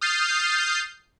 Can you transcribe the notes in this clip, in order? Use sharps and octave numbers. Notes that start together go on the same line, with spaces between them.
D#6 F6 G6 A6 C7